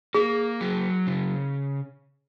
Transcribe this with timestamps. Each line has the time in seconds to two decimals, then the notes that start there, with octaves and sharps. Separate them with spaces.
0.14 A#3 G#4
0.61 F#3
1.07 C#3